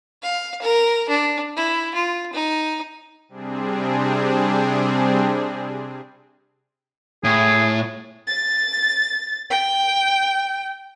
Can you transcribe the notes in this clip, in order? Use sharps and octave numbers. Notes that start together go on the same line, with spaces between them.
F5
A#4
D4
E4
F4
D#4
C3 G3 C4 D4 G#4
A2 G#4
A6
G5